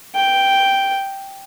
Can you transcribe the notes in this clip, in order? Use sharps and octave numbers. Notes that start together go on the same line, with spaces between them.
G5